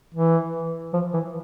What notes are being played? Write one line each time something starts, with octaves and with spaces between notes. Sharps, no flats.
E3
F3
E3